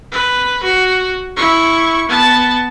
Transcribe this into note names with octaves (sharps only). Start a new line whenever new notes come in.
B4
F#4
E4 C#6
B3 A5